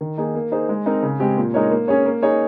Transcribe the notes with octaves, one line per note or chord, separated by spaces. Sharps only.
D#3
A#3 D#4 G#4
A#3
D#4 G#4 C5
G#3
C4 D#4 A#4
C#3
G#3 C4 G4
A#2
G#3 D#4 A#4 C#5
A#3
C#4 G#4 C#5
A#3
D#4 G#4 C#5